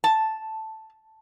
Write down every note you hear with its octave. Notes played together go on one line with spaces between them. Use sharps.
A5